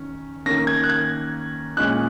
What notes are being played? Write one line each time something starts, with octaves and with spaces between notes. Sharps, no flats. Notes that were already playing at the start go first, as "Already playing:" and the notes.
Already playing: D#3 C#4
D#3 A#3 C#4 A#6
G#6
F#6
G#6
A#2 G#3 C#4 F#6